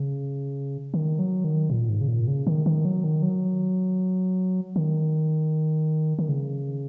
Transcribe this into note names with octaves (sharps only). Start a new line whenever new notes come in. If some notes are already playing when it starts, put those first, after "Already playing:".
Already playing: C#3
D#3
F#3
D#3
A#2
G#2
C#3
A#2
C#3
D#3
D#3
F#3
D#3
F#3
D#3
D#3
C#3